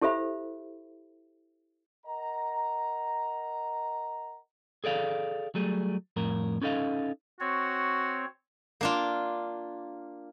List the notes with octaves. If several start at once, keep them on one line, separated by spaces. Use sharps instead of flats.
E4 G4 A4 C5 E5 B5
A#4 D#5 F#5 A#5
G#4 A4 D5 F5
F#3 G3 A3 G#4
F2 A2 A#4
C#4 D#4 A4 D#5 F5
C4 F#4 C#5
A#3 D4 F4